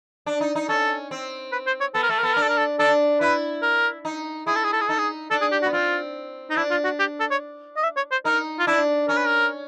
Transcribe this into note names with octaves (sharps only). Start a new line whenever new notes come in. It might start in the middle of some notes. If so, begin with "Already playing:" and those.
D4
D#4
D#4
C#4 A4
C4
B4
C5
C#5
B3 A4
A#4
A3 A4
A#4
B3 A4
D4 A#4
A4
A#4
A4
D4 A4
E4 B4
A#4
D#4
E4 G#4
A4
G#4
A4
G#4
D#4 A4
G#4
D4 A4
G#4
G4
F#4
B3
C4 F4
D#4
D4 E4
F4
F#4
G4
A4
C#5
D#5
E5
C#5
C5
D#4 A#4
F4
D4 E4
C#4 A#4
B4
A#4